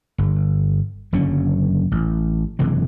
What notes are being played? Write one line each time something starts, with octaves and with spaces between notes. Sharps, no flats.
G1
F#1 D3 F#3 C#4
A1
F#1 C3 E3 G#3